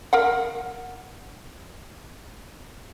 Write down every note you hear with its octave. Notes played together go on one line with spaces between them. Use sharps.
A#4 F5 F#5